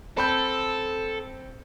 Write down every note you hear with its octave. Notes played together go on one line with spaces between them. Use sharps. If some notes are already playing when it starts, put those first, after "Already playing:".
C4 A4 B5 G6